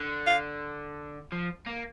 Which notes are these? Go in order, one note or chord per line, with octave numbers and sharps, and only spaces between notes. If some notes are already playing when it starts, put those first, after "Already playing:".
Already playing: D3
F5
F3
A#3